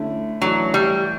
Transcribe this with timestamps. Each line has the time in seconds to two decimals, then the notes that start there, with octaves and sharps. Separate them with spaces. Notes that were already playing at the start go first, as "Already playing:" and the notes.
Already playing: D3 A3 C#4 E4
0.41 E3 F#3 A3 D4
0.74 G3